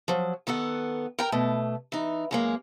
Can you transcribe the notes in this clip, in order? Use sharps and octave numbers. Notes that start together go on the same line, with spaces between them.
F3 F#3
D#3 B3 A4 F#5
A#4 G5 A#5
B2 A3
E3 D#4
F#2 G#3 A#3